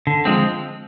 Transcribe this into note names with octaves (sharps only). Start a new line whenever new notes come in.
D3
F3 G#3 C4